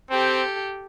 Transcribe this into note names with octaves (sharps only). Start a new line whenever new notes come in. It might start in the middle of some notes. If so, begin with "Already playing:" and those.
C4 G4 A4